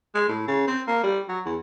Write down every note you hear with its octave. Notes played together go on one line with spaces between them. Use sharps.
G#3
A2
C#3
C4
A#3
G3
F#3
E2